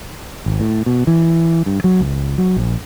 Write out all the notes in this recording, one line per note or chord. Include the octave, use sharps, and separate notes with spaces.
G#1
A2
B2
E3
G2
F#3
C#2
F#3
A#1